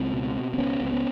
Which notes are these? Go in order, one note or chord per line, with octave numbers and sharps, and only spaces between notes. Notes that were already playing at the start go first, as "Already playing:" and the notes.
Already playing: C#2 C4
B2
B2
C4
C#2 B3 C#4
C#2 C4
B3 C#4